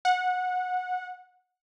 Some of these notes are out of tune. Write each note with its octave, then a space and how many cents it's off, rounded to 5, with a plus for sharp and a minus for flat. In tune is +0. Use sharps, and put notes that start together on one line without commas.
F#5 -20